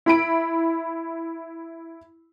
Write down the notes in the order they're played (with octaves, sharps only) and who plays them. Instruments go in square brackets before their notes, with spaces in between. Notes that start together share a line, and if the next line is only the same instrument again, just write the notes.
[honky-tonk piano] E4 B5 D7